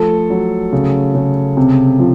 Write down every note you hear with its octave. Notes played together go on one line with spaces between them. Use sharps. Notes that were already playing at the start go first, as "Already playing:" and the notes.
Already playing: F3 A3 A4
F#3
C#3
C#3
C3
F3